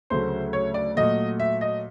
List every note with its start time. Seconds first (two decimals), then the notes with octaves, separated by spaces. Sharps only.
0.10 D2 C#3 F#3 A3 C5
0.53 C#5
0.74 D5
0.96 A#2 F#3 A3 D#5
1.40 E5
1.61 D#5